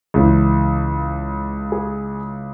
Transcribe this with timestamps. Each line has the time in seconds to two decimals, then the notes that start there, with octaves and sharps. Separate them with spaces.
0.14 C#2 C#3 E3
1.72 G#4